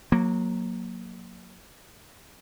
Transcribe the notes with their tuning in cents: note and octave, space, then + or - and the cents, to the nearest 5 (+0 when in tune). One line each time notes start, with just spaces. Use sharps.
F#3 -20 A#3 +0